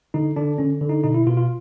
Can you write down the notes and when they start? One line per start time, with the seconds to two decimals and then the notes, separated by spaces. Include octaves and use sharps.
0.14 D3 D#4
0.36 D3 D4
0.58 D3 C#4
0.81 D3
0.89 D#4
1.03 B2 D#4
1.14 E4
1.27 B2 F4
1.37 F4